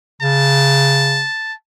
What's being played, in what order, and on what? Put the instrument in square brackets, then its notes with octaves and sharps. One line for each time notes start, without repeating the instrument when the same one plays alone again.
[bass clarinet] C#3 [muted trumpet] A5